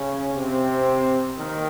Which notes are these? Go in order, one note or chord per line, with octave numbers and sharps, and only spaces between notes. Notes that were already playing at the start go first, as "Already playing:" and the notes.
Already playing: C#3 C#4
C3 C4
D#2 D#3